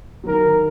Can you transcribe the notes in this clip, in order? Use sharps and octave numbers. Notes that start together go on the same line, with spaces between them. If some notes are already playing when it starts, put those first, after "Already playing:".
F#3
D#3 A#4